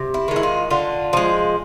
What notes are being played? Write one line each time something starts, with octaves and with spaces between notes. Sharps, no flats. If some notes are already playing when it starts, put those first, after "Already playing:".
Already playing: C3
E4
D#3 G#3
E4
F4
D3 F4
F3 G#3